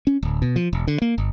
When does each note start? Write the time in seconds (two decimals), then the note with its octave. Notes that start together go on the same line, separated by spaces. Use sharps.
0.07 C#4
0.23 D1
0.42 B2
0.56 F3
0.73 E1
0.88 D3
1.02 A#3
1.18 G1